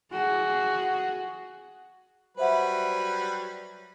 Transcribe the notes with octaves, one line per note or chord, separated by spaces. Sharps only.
F#4 G#4
F#3 G3 B4 C5 E5 F#5